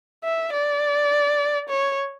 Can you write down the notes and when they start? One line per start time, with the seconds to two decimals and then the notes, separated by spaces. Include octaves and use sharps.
0.24 E5
0.53 D5
1.69 C#5